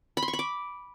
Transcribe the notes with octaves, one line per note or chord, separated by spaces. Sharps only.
B5
C6
C#6
B5
D6